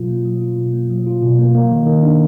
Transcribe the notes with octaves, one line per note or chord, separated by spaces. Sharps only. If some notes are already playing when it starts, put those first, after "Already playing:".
Already playing: B2 F#3 F4
A#3
F#3
F4
B2
A#3
F#3
F4
B2
A#3
A#3
D#3
D#3
D4